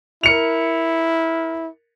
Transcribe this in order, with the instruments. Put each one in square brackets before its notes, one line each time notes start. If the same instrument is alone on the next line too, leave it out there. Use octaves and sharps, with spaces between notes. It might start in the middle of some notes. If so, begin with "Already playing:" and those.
[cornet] E4 [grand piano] A#4 C#7 F7